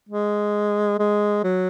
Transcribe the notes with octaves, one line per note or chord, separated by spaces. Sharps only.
G#3
G#3
F#3